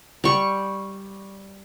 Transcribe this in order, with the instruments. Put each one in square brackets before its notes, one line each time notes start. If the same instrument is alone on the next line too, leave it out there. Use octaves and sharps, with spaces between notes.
[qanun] G3 C#6